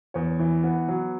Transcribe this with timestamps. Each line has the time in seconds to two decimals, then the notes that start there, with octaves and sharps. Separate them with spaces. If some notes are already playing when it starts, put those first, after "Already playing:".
0.14 E2 C#5
0.39 E3
0.64 B3
0.88 F#3